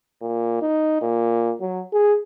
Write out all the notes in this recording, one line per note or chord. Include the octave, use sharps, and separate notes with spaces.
A#2
D#4
A#2
F#3
G#4